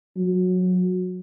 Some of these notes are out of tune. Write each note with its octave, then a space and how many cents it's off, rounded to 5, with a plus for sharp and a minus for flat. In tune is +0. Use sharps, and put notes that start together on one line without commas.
F#3 -20